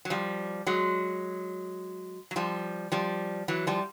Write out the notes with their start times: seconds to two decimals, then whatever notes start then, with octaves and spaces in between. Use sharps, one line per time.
0.05 F#3
0.10 F3 G3
0.67 F#3 G#3
2.31 F#3
2.36 F3 G3
2.92 F3 G3
3.48 E3 F#3
3.67 F3 G3